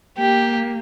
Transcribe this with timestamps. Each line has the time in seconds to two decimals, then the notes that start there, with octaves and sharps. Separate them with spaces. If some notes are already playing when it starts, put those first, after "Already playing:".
0.18 A#3 G4